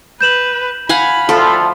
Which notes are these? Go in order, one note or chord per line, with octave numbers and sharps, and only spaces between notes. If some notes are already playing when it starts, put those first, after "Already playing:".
B4 G6 E7 F#7
F5 F#5 G#5 B5
D2 F3 F4 A4